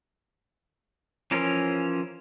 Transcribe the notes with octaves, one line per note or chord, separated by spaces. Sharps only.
E3 F3 C#4 A#4